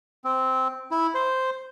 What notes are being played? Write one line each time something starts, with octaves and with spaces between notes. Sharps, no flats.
C4
E4
C5